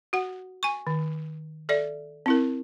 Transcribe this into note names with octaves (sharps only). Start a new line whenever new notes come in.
F#4 F#5
G#5 C#6
D#3
A4 D5 E5
C4 E4 A#4